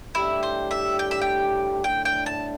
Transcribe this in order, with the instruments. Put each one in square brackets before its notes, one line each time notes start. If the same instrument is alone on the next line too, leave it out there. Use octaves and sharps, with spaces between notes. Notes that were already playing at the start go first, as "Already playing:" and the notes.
[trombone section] A2 G3 D4 G4 [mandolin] E4
[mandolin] C5
E5
G5
E5
G5
[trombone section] A2 A3 D4 [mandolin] G5
[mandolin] G5
A5